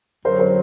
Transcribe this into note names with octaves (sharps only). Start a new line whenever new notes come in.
F#2 D3 F#3 A#4 C5
A#4 C5